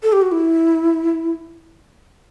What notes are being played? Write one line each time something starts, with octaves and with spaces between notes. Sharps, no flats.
A4
G4
F#4
E4